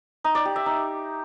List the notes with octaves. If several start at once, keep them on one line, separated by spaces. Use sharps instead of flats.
D#4
D5
G4
E5
D#4